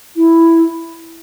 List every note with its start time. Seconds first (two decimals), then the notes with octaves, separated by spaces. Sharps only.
0.16 E4